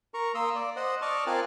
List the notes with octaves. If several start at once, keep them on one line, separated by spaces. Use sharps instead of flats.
A#4 A#5 C#6
A#3 C6 D#6 E6
D5
C5 D#5 F#5
D5 D#5 A5 C#6 F6
C4 F4 A#4 G#5 A5 F#6